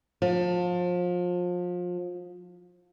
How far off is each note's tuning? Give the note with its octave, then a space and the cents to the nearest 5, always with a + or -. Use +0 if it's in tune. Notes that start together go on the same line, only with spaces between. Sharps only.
F3 +30